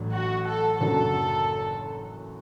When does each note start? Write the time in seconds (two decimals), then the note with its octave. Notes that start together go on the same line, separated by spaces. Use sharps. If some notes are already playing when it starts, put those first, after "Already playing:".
Already playing: A1 A2 F#3 D4
0.12 F#4
0.47 A4
0.81 F#1 F#2 F#3 D4 F#4 A4